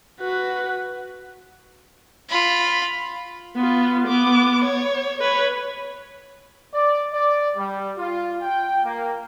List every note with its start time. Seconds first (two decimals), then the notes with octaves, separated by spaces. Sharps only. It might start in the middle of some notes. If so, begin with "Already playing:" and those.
0.20 F#4 B4
2.29 F4 B5
3.56 B3 F4
4.07 B3 D6
4.65 C#5
5.21 B4 C#5
6.73 D5
7.13 D5
7.57 G3
7.98 F4
8.42 G5
8.84 A#3